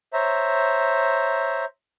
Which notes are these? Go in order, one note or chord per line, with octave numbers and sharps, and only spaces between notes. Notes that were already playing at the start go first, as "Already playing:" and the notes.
C5 C#5 E5 A#5